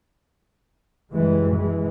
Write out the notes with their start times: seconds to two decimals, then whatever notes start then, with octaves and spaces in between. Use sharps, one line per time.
1.13 F#1 F#2 E3 G3 G#3
1.56 E3 G#3